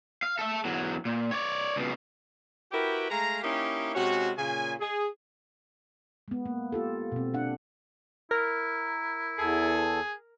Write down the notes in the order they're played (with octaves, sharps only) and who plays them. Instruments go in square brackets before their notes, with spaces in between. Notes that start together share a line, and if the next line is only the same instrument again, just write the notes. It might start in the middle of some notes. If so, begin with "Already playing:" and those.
[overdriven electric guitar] F5
A4 E5
E2 F#3
A#2
C#5 D5
C#2 B2
[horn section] E4 F#4 G4 A#4 B4 G5
G#3 A3 F5 A#5
A#3 C#4 D#4 E4 G4
C3 G#3 C#4 F#4
A#2 C#3 G#5
G#4
[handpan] G#3 B3
A#3
F4 G4 A4
B2 C4
D4 F#5
[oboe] E4 [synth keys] A#4
[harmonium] E2 A4 [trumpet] G#4